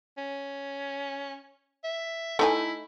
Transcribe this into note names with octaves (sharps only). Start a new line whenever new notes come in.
C#4
E5
A3 D#4 E4 G#5